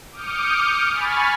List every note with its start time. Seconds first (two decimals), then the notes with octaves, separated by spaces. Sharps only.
0.12 D6 D#6 F6 G6 C#7
0.92 G#5 B5 C#6 F6 A6